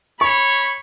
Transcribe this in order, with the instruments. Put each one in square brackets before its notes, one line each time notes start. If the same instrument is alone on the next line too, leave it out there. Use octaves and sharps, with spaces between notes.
[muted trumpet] C#5 [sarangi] B5 [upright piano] C#6